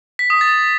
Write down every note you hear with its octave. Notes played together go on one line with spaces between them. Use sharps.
B6
D#6
A6